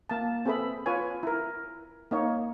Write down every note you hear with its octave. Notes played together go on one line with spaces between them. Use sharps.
A#3 A5
C4 G#4 A4 B4 E5 B5
F4 B4 C#5 G#5
E4 A#4
A#3 D#4 C#5